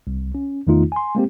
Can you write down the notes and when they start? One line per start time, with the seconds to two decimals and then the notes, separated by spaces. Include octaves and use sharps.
0.07 C2
0.35 C#4
0.67 E2 D#3 A3 D#4 F4
0.92 G#5 C6
1.15 G#3 A#3 C4 G4